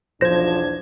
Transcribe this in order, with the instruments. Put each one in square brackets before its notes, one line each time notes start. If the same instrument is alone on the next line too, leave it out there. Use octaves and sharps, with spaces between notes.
[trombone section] B1 E2 D4 [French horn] F3 [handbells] C5 A#6 [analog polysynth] G#6 E7